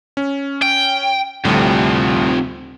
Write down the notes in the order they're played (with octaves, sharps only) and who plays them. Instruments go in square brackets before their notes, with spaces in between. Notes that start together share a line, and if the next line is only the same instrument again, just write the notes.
[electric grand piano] C#4
[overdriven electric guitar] G5
[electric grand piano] D2 A2 G3 [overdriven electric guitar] C3 F3